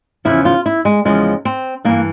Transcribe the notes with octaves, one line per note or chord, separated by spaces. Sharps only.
E2 C#3 F3 E4
F4
E4
G#3
E2 C#3 F3 G#3
C4
G2 E3 A#3